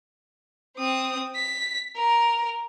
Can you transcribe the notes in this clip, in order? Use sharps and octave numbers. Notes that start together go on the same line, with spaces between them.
C4 D#6
B6
A#4